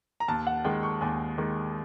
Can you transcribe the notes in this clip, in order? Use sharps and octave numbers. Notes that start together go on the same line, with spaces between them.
A#5
D#2 A5
F#5
D#3 G#3 G5
C#6
D#2 G#5
D#3 G#3